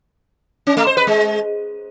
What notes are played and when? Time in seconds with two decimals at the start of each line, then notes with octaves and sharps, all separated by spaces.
0.67 C#4
0.77 A3
0.87 C5
0.97 B4
1.07 G#3